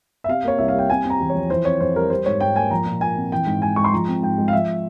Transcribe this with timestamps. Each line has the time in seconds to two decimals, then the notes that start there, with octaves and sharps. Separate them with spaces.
0.24 E5
0.28 C3 F5
0.44 A#3 C#5
0.58 C2 E5
0.68 F5
0.74 G3 G5
0.90 C3 G#5
1.04 C4
1.10 A#5
1.20 E2
1.29 F3 C#5
1.49 E3 C5
1.65 C4 C#5
1.80 F2 C5
1.96 G3 A#4
2.10 G3 C5
2.26 G#2 C#5
2.41 G#2 G5
2.56 A#3 G#5
2.71 F3 A#5
2.86 A#2
3.01 A#2 G#5
3.16 C4
3.32 E3 G5
3.46 G#2
3.62 G#2 G#5
3.76 G#3 C#6
3.84 C6
3.93 F3 A#5
4.08 C4
4.22 G#2 G5
4.38 G#3
4.48 F5
4.53 F3 E5